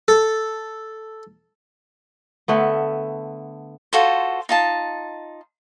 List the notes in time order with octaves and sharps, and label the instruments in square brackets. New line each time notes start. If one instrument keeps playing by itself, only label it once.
[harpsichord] A4
[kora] D3 A3 B3
[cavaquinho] F4 F#4 A4 C5
D#4 F4 A5